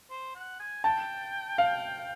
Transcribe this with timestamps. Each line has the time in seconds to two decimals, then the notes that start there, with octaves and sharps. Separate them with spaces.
0.10 C5
0.35 F#5
0.60 G#5
0.84 G5 A5
1.58 F5